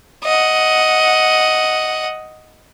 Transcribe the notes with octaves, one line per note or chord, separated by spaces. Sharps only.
D#5 F#5